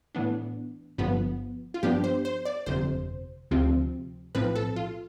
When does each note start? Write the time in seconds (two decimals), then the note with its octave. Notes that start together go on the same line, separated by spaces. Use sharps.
0.15 A2 E3 B3 D4
0.98 G1 G2 F3 B3
1.74 F4
1.83 G2 F3 B3 D4 G4
2.04 C5
2.25 C5
2.45 D5
2.66 G1 F2 C3 C5
3.51 D2 C3 F3 C4
4.35 B1 A2 F3 C4 B4
4.55 A4
4.76 F4